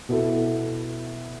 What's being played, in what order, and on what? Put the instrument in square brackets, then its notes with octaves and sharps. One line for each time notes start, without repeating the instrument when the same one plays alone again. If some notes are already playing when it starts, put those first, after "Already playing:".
[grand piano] B2 B3 E4 A4